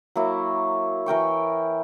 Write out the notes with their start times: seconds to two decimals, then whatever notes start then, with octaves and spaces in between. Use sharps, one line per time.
0.16 F#3 A#3 E4 F#4
1.06 E3 A#4 G5 C#6